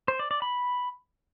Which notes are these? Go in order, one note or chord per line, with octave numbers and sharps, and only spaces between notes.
C5
D5
D5
B5